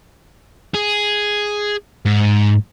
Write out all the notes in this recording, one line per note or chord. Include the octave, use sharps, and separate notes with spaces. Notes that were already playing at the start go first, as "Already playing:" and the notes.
G#4
G#2